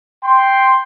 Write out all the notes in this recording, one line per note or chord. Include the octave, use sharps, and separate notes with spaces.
G5 C6